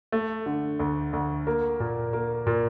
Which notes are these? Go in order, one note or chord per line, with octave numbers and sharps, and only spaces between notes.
A3
D3
D2
D2
A#3
A#2
A#3
A#2